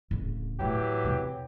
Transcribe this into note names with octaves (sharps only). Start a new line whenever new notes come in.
D1 C#3
A2 E3 F#3 G4
E2 C3